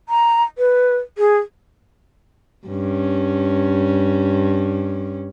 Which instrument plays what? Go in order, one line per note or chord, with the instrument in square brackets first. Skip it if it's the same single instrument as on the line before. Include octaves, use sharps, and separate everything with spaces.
[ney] A#5
B4
G#4
[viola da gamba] G2 C#4